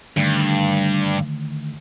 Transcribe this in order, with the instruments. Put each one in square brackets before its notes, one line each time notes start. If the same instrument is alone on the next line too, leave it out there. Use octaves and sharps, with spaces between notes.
[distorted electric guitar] G2 [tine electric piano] D3 D#3 A3